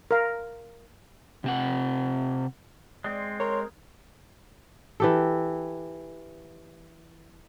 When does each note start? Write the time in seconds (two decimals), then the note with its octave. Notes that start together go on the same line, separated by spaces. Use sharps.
0.11 A#4 F5
1.44 C3 C4 F#5
3.04 G#3 C4 D5
3.40 A#4 C#5 C6
5.00 E3 G4 A4